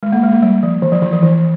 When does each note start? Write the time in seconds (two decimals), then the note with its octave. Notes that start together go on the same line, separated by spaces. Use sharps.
0.03 G#3
0.12 A#3
0.23 G#3
0.32 A#3
0.42 G3
0.63 F3
0.82 E3
0.92 F3
1.02 E3
1.12 F3
1.23 E3